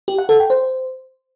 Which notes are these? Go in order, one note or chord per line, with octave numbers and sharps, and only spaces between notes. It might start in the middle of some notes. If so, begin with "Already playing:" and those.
G4
F#5
A4
G5
C5